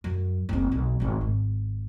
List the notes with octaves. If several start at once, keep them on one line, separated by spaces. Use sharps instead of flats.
F#2
F#1 C4
B1
G#1 D#4
G#1